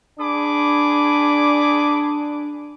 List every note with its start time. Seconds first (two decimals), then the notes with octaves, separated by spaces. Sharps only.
0.19 D4 G#4 B5 D6